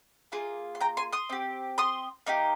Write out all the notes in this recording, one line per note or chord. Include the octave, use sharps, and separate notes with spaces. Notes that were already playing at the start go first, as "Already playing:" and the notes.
A#3 F4 G#4
C6
G5 A#5
G#5 C6
C6 D#6
C4 G4
C6 D#6
A#3 D#4 G4